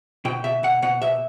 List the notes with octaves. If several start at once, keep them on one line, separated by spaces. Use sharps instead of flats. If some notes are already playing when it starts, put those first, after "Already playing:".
B2 G5
B2 E5
B2 F#5
B2 F#5
B2 E5